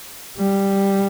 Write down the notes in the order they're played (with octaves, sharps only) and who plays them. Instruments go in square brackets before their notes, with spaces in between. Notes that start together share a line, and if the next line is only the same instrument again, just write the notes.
[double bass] G3